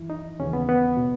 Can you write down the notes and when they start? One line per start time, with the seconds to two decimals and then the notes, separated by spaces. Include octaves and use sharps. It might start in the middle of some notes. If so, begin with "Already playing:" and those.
Already playing: F#2 E3 E4
0.10 D#4
0.39 D#2 C#3 E3 C#4
0.53 B3
0.69 B3
0.97 B2